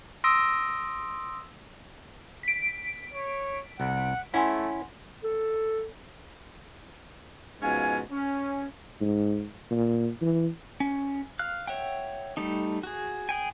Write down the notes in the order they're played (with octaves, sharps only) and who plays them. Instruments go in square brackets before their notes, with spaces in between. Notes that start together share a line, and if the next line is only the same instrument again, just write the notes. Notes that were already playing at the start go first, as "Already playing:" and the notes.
[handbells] C6 D#6 E6 A#6 D7
[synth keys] B6 D7
[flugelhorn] C#5
[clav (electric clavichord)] C2 [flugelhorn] F#5
[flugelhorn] A3 [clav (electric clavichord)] C#4 E4 [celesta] F#5 G#5 C6
[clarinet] A4
[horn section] G#2 B2 F3 C#4 F5 G#5
C#4
[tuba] G#2
A#2
E3
[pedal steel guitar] C#4
F5 F6 F#6
C#5 E5 F#5 G5
G3 A3 D#4
F#4 G#4
G#4 G5 G#5